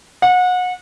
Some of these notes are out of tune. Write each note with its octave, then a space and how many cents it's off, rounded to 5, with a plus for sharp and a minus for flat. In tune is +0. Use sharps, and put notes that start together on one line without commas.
F#5 -30